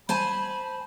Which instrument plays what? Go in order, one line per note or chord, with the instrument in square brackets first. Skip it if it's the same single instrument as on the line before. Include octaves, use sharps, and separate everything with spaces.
[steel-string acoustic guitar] C5 G#5 A5 [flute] B5